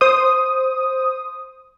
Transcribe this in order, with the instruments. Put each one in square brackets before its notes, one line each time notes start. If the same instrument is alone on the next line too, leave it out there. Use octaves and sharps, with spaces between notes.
[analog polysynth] C5 D#6